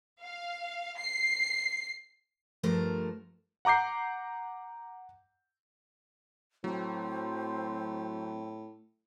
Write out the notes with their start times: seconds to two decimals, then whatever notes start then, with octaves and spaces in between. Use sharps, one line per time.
0.21 F5
0.97 C7
2.63 G2 F3 A3 A#4 C5
3.65 F#5 A#5 D6 G6 C7
6.64 A2 F#3 C4